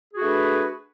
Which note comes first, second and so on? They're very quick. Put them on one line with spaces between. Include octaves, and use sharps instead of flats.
G#4 F#4 D4 A3 B4